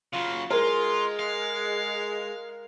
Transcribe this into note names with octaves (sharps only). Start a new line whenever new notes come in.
C#3 F#3 F4
G#3 F4 A#4
F5